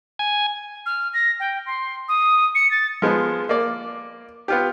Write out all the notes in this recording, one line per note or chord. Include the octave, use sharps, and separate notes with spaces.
G#5
F6
A#6
G5
C6
D#6
C#7
A6
F3 G#3 B3
A#3 D5
B3 F4 G4